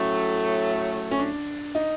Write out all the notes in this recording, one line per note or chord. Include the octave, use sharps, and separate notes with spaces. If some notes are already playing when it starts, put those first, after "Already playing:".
Already playing: A2 F#3 A3 C#4
C#4
D4
D#4